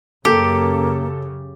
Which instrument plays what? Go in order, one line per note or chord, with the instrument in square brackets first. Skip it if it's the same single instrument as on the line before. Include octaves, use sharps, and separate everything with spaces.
[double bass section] F#2 C#3 [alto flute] A#3 [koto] G4 [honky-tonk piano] A4